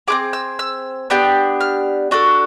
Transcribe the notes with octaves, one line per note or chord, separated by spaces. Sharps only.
C4 F4 G#4 D6
E6
E6
B3 D4 G4
F6
D4 F#4 A4